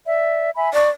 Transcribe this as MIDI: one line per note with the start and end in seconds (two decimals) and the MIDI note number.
0.07 0.50 74
0.07 0.50 76
0.56 0.70 76
0.56 0.70 80
0.56 0.70 83
0.73 0.89 74
0.73 0.89 85